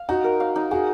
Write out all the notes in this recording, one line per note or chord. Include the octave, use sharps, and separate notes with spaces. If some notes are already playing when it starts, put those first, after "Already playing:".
Already playing: F5
D#4 F#4
A#4
F5
D#4
F#4 G#4